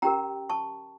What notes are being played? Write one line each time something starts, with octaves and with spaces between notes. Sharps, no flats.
C#4 G4 A#4 G5 A#5
A5 C#6